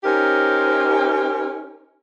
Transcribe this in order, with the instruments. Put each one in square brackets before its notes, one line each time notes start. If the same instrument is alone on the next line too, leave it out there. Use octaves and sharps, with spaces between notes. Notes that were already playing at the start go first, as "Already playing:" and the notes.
[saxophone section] C#4 D#4 G4 A#4 C5